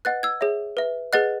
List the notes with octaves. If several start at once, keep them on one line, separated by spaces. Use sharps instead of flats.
B4 D#5 F#5 F#6 A6
E6 G#6
G#4 C#5 E5
B4 E5
G#4 B4 D#5 F#5 F#6 A6